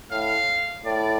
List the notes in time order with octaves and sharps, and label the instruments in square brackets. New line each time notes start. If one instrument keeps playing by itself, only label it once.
[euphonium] A2 [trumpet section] F5
[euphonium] A2 [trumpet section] D5